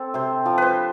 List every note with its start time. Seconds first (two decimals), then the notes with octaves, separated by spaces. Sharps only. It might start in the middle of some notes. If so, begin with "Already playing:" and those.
Already playing: C4 A4
0.14 C3 C5
0.45 F3
0.58 B4 C5